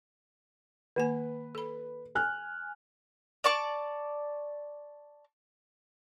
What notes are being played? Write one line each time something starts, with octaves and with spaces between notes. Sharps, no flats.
D#3 A#3 B4 G#5
A4 B5
G#5 F6 F#6
D5 A5 C#6 D6